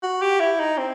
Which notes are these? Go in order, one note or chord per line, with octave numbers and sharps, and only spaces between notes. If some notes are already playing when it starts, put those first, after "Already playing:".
F#4
G4
E4
D#4
C4